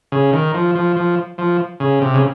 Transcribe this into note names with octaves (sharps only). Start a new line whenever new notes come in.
C#3
D#3
F3
F3
F3
F3
C#3
C3
C#3